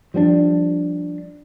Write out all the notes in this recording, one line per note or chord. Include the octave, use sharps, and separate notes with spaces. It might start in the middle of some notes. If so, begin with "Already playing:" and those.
F3 G3 C4 D4